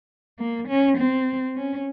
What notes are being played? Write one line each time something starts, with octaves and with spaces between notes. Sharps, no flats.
A#3
C#4
C4
C#4